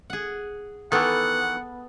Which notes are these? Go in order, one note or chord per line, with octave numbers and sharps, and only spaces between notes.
G#4 F#5
D#3 E3 B3 A4 F#5